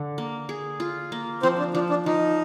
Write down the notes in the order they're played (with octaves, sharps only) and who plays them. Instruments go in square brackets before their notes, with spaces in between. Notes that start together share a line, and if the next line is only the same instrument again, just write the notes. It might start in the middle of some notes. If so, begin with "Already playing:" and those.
Already playing: [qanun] D3
A#3
G#4
F4
A#3
[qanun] F3 [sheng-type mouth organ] C4 C5
[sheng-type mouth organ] D4
[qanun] F3 [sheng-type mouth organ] D4
[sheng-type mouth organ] D4
[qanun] F3 [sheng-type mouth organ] D#4